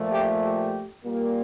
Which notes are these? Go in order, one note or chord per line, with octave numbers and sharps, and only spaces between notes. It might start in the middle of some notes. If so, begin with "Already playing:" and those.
Already playing: A#2 F3 A3
G4
G4
A#2 G3 A#3